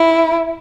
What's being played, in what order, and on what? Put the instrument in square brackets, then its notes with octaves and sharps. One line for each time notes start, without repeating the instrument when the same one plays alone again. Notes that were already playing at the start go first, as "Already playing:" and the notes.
Already playing: [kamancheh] E4